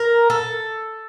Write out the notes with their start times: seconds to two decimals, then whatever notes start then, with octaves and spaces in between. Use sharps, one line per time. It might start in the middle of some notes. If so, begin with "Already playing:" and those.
Already playing: A#4
0.30 A4